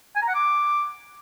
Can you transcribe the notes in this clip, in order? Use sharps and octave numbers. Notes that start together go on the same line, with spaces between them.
G#5
A#5
F#5
D6